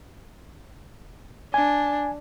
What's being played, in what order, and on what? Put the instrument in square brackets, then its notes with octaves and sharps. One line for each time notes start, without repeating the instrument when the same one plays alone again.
[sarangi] D4 [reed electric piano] G#5